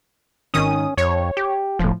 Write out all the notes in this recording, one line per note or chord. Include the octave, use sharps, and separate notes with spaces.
G#1 D#3 C#4 D#6
F2 C#5
G4
E1 A2 F3